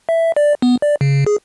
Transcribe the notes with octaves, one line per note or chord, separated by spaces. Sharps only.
E5
D5
B3
D5
C#3
G#4